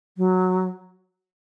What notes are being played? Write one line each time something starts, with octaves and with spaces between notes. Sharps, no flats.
F#3